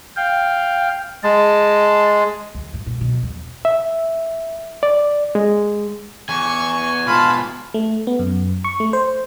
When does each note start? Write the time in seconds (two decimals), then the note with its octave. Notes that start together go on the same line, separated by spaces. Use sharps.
0.17 F5 G5
1.23 G#3 A5
2.54 D2
2.74 A2
2.87 A#2
3.01 B2
3.23 E2
3.65 E5
4.83 D5
5.35 G#3
6.29 E2 G#5 C#6
7.07 G#2 B2 F4 A5 B5
7.74 A3
8.07 B3
8.19 F#2
8.64 C#6
8.80 A3
8.93 C5